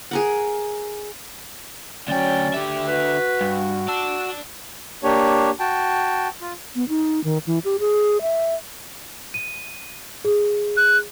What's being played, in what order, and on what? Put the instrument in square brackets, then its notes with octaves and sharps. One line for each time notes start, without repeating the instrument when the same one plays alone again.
[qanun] G#4 A#4 F#5
[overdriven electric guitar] D2 G5 [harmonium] F#3 C#4 [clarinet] D5
[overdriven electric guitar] D3 E5 [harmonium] G4
[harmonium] F#4 [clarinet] B4
[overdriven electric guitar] G2
[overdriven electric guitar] D5 A5 [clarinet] E6
[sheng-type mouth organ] A#3 D4 G4 C#5
F#4 G5 A5
F4
[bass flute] B3
D#4
D#3
E3
G4
G#4
E5
[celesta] D#7
G#4
[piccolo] F#6